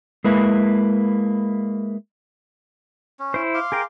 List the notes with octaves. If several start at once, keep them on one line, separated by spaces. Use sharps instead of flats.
G#3 A#3 E4 B4
C#4
E4 C5
F5 C6 D6
G#4 A#4 G5